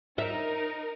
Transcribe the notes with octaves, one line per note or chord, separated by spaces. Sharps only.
D#4 A#4 E5